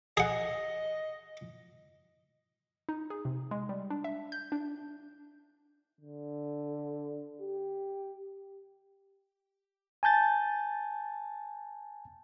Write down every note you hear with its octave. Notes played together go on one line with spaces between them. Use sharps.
G#4 D#5 F#5
D#4
G#4
C3
G#3
G3
D4
E5
G6
D4
D3
G4
G#5 A5 G6 A6